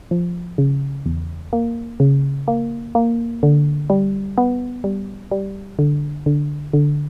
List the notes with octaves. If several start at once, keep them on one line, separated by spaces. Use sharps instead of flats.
F3
C#3
E2
A#3
C#3
A#3
A#3
D3
G3
B3
G3
G3
D3
D3
D3